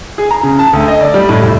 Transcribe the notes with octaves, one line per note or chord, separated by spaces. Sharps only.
G#4
A#5
C#3
A5
D2
D#5
D5
G3
A2
F1